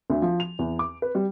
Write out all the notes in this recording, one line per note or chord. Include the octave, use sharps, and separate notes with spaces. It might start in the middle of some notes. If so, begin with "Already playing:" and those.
D2
F3
F7
E2
D6
B4
G3